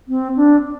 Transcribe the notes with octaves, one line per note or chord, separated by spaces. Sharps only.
C4
D4